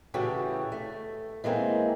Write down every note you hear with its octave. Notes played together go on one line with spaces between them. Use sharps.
A2 C#3 E3 F#4 G4 A4
A3
E3 G#3 A#3 C4